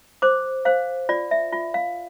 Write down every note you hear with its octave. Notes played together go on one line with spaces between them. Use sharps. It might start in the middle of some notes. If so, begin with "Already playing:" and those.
C5 D6
C5 F5
F4 D5
E5
F4
F5